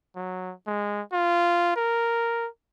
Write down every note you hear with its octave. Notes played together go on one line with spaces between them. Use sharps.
F#3
G#3
F4
A#4